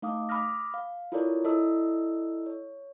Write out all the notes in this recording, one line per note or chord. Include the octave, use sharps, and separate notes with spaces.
A3 D#4 F5 D6 D#6
B5 D6 D#6 F6 A#6
F5
E4 F4 A4 A#4 C#5 D5
E4 A4 D5 D#5 E6
C#5